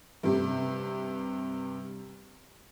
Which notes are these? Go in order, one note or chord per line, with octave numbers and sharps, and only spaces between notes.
G2 C3